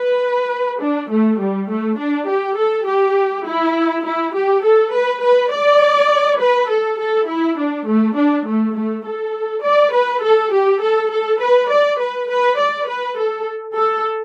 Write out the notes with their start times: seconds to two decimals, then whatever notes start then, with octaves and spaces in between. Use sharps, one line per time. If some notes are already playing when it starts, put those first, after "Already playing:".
Already playing: B4
0.81 D4
1.10 A3
1.40 G3
1.69 A3
1.98 D4
2.28 G4
2.58 A4
2.87 G4
3.46 E4
4.04 E4
4.34 G4
4.64 A4
4.93 B4
5.22 B4
5.52 D5
6.40 B4
6.70 A4
6.99 A4
7.28 E4
7.58 D4
7.87 A3
8.17 D4
8.46 A3
8.76 A3
9.05 A4
9.64 D5
9.93 B4
10.23 A4
10.53 G4
10.82 A4
11.11 A4
11.40 B4
11.70 D5
11.99 B4
12.29 B4
12.59 D5
12.88 B4
13.18 A4
13.76 A4